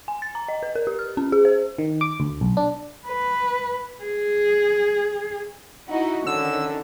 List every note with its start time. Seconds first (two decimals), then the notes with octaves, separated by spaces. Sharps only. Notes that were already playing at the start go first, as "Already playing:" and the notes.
0.08 G#5
0.22 A6
0.35 A#5
0.49 D#5
0.63 B4
0.76 A#4
0.87 G4
0.99 F6
1.17 C#4
1.32 G#4
1.45 C5
1.78 D#3
2.01 D6
2.20 D2
2.41 B1
2.57 D4
3.07 B4
4.03 G#4
5.88 D#4 E4 F#4
6.27 D3 D#3 C#4 E6